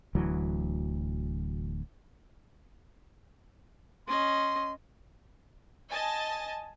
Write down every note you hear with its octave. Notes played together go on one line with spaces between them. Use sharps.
D1 D2 E3 F#3
C#4 D#5 C6
D#5 G#5 A5 A6